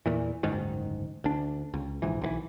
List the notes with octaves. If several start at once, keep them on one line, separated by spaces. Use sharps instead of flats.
E2 A#2 E3
F#1 D2 G#2 D#3
D2 D4
C#2
A#1 G#2 E3
B1 D3 E3